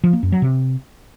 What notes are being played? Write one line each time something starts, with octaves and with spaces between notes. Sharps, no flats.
F3
A#3
F#2
F#3
C3